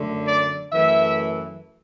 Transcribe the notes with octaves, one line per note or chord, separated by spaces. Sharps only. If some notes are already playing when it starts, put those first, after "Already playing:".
Already playing: F#2 D3 A3
D5
F#2 E3 A3 E5